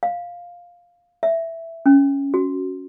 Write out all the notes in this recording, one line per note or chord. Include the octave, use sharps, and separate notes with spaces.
F5
E5
C#4
F#4